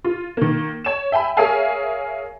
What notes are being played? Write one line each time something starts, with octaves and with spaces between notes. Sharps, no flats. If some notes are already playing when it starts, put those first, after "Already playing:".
F4
D#3 A#3
C#5 E7
E5 G5 G#5 B5
G#4 A#4 C#5 E5 F5 G#5